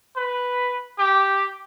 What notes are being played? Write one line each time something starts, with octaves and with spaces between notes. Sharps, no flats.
B4
G4